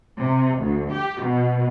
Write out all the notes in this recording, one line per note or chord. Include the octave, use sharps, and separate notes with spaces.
C3
D2
G4
B2